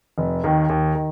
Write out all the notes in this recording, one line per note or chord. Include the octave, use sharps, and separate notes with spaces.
F1
D#2 D#3
D#2
D#3